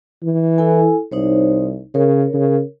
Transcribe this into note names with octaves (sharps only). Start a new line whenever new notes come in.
E3
E4 A4 G#5
C2 D#4 C5 C#5
C#3 A#4 C#5
C#3